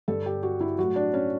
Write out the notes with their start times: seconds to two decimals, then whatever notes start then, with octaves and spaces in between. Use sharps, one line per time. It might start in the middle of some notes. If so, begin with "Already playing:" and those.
0.08 G2 D3 G3 A4
0.26 G4
0.43 F#4
0.61 E4
0.78 A2 F#3 F#4
0.96 D4
1.14 C#4